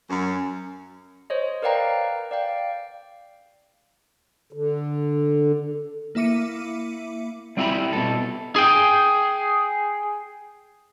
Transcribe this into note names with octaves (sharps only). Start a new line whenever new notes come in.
F#2
C5 C#5 D#5
A#4 B4 D5 F5 G5 A#5
D5 F5 G5
D3
A#3 E4 E5 D6 C#7 D#7
G3 C4 E4 G4 A#5 B5
B2 A4
G#4 G5